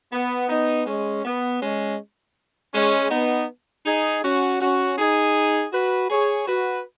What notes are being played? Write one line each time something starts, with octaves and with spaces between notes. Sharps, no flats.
B3
B3 D#4
G#3 C#4
B3
G#3 C#4
G#3 C#4
B3 D#4
D#4 G#4
C#4 F#4
C#4 F#4
D#4 G#4
F#4 B4
G#4 C#5
F#4 B4